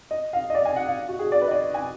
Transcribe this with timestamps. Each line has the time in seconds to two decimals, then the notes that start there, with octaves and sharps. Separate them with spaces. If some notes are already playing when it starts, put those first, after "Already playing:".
0.11 D#5
0.33 F5
0.50 D#5
0.55 D5
0.65 G#5
0.76 F#5
0.86 F5
1.09 F#4
1.19 G#4
1.32 D5
1.42 B4
1.48 D#5
1.52 D5
1.74 G#5